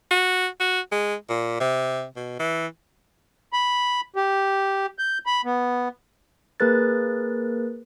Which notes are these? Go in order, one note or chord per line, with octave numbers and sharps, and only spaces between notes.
F#4
F#4
G#3
A#2
C3
B2
E3
B5
G4
G6
B5
B3
A#3 G#4 A#4 B4 F#6 A6